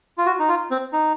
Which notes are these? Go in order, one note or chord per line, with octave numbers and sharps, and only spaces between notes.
F4
F#4
D#4
F4
C4
D#4